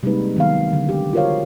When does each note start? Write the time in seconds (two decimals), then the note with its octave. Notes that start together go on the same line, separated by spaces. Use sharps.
0.03 C3 G3 G#3 A#3 D#4 B4
0.36 D#3 F#3 B3 C4 F5
0.73 D3
0.89 G4
1.13 F4 F#4 A#4 C5 C#5 F5